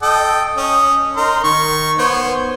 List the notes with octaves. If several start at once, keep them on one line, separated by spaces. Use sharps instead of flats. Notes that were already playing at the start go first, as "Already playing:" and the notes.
A4 D#5 G5
C#4 D#5 D#6
D#4 A#4 C6
D#3 C#6
B3 C5 C#5